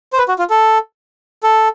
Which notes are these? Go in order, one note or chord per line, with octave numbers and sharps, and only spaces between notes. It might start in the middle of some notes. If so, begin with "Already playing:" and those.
C5
B4
F#4
F4
A4
A4